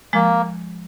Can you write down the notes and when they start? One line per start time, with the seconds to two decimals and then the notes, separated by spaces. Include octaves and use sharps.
0.13 F3 G#3 A#3